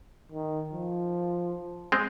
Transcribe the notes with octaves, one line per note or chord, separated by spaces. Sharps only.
D#3
F3
G#3 C4